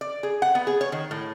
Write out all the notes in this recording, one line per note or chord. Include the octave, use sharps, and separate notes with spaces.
D5
G#4
F#5
B3
G#4
C#5
D#3
A2